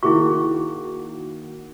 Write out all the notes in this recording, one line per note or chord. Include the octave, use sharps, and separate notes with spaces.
D#3 A#3 E4 F#4 G#4 C#6